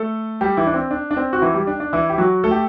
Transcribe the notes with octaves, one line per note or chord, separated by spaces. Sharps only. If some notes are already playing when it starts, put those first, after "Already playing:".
Already playing: A3 A4
G3 G4
E3 E4
D4
C4
D4
D4
C4
F#4
E3 E4
G3 G4
D4
D4
E3 E4
G4
F#3 F#4
A3 A4
G4